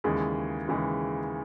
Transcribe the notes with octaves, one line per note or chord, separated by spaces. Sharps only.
D#2 C#3 E3 G#3
D#2 C#3 E3 G#3